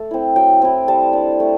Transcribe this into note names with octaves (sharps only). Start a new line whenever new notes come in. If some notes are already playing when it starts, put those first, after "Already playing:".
Already playing: A3 A4
C4 E4
F#3 G5
C4 E4
G3 A5
D4
A3